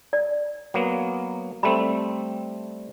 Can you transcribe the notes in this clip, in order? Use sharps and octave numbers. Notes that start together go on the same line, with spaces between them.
D5
F#3 A#3 B3
G3 A3 C4 B5